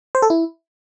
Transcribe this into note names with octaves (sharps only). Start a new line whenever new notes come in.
C5
A4
E4